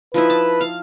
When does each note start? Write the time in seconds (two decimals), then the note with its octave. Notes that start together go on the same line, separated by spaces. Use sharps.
0.14 F3 D#4 E4 B4
0.30 A5
0.61 F5